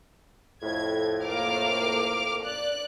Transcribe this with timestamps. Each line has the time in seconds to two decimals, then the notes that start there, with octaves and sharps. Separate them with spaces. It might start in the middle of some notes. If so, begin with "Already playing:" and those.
0.63 F2 A2 G#6
1.23 A#3 D6 F6
2.42 D5 F#6